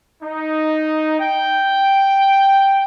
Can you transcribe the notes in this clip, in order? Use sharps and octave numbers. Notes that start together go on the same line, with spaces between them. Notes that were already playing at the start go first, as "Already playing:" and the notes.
D#4
G5